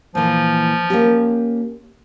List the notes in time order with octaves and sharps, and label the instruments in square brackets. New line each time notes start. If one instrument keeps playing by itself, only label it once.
[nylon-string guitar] A#2 E3 [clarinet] F3
[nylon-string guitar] A#3 C#4 G4